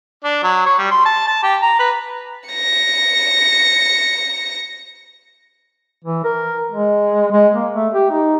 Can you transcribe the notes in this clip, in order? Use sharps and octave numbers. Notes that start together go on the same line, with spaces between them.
D4
F#3
C#5
G3
C6
A5
A5
G4
A#5
B4
A#6 C#7
E3
A#4
G#3
G#3
A#3
A3
G4
D#4